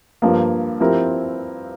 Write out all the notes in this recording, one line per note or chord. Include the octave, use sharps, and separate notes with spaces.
G2 F3 A#3
F3 C4 E4 G4 A#4